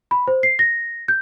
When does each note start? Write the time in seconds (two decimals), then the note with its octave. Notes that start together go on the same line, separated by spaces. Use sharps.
0.11 B5
0.28 C5
0.43 C7
0.59 A#6
1.08 G6